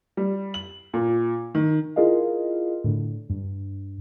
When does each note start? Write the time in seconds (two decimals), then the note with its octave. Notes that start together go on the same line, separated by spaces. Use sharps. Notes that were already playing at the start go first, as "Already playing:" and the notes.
0.17 G3
0.54 F#7
0.94 A#2
1.55 D#3
1.96 E4 F4 G#4 A#4 D#5 F5
2.84 A2 D3
3.30 G2